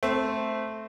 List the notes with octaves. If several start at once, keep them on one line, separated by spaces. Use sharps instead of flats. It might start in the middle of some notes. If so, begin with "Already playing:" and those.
A3 C4